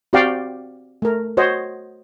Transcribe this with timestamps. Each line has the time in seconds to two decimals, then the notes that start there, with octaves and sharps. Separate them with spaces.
0.13 C4 F#4 G4 D5 F5 G5
1.02 A3 A#4
1.37 F#4 C5 C#5 D#5